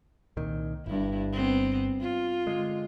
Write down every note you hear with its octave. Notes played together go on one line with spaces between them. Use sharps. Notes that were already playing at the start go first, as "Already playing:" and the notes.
C2 A#2 D#3
G1 G2 E4
B3 C4
F4
D3 G#3